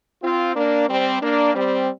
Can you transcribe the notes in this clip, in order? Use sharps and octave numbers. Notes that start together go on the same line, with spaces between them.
C4 F4
A#3 D4
G3 C4
A#3 D4
G3 C4